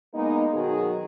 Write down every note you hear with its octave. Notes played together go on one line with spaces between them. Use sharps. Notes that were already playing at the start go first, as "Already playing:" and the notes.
G#3 A#3 B3 D#4
B2 D#3 F#3 F#4 G#4